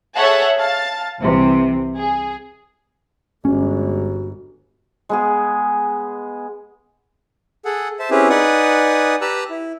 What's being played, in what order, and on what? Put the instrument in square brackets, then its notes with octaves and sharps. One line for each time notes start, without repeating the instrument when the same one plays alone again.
[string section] G#4 A4 C#5 E5 F#5 A5
F5 A5 A6
C2 C3 E3
G#4
[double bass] G1 [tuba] G#3 [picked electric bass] C#4 [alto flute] F#4
[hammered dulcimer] G#3 B3 G#4
[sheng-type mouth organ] G#4 A4 F#5
C5 E5 A5
C4 C#4 E4 G4 G#4 B4
D#4 B4 D5 F#5 G#5 D#6
G4 B4 A5 A#5 E6 F#6
E4